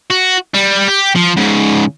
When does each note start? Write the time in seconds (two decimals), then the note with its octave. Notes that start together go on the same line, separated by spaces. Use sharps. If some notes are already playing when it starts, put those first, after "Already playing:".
0.11 F#4
0.54 G3
0.88 G4
1.16 F3
1.37 G#2 C#3